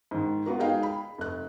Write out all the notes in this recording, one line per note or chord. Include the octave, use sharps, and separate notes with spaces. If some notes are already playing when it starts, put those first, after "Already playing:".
G#2 D#3
B3 F4 F#4 A#4
G#3 D#4 G#4 D#5 F5 G5
B5
F1 F#6